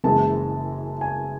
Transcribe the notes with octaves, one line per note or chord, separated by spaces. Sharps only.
F#1 F#2 E3 G#3 A5
G#5